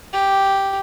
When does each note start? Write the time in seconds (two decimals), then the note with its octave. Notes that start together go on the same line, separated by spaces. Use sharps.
0.13 G4